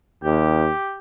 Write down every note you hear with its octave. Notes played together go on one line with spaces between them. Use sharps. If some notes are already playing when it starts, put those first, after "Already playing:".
D#2 G4